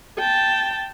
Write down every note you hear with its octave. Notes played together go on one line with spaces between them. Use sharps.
G5 A5